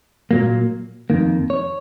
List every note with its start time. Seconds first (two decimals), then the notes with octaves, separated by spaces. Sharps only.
0.31 A#2 F#3 A#3
1.10 F2 D#3 A#3
1.50 C#5